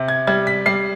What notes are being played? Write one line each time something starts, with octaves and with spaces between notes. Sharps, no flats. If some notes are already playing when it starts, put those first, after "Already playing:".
Already playing: C3
G#6
G3 G#6
B6
G3 C7